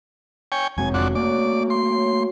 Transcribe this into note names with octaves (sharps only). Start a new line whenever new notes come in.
C#5 G5 G#5
F1 F#3 G#3 B3 C4 E4 G#5
F2 D4 F#4
A3 A#3 C#4 F#4 D5 D#6
E5 C6
C#4 C#5